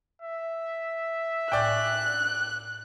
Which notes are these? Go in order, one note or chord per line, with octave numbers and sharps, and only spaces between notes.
E5
A2 D5 G5 G#5 C#6 F#6